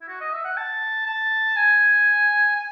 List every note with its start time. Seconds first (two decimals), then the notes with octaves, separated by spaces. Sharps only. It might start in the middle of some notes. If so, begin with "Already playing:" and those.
0.02 E4
0.08 F#4
0.21 D#5
0.33 E5
0.45 F#5
0.57 A5
1.06 A5
1.56 G#5
2.56 G#5